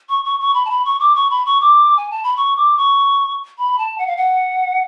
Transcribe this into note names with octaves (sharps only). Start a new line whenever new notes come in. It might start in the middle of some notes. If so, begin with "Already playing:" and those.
C#6
C#6
C#6
B5
A5
B5
C#6
D6
C#6
B5
C#6
D6
G#5
A5
B5
C#6
D6
C#6
B5
A5
F#5
F5
F#5